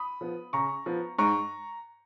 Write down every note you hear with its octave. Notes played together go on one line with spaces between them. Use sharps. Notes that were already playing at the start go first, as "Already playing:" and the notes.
Already playing: B5 D#6
F3 B3
C#3 A#5 C#6
F3 B3
G#2 A#5 C#6